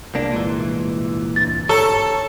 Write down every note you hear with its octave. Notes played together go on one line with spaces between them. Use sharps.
E1 C2 G#3 A#3 D4
A#2 E3
C#2 G2 A6
G#2 A4 C#5 A#5